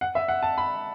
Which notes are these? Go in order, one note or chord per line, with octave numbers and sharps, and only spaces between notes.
F#5
E5
F#5
A5
B5